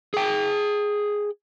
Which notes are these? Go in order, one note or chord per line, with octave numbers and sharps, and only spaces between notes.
G#4 G5